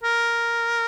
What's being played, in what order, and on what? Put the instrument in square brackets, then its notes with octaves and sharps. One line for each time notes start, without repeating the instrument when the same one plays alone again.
[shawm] A#4